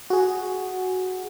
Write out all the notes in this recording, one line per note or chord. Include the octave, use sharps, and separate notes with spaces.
F#4 G#4